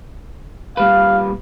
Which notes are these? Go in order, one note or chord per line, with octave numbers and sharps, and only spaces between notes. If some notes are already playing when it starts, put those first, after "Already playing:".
A#2 G3 B4 F5